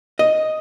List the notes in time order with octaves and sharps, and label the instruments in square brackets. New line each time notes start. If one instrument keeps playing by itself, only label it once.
[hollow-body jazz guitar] D#5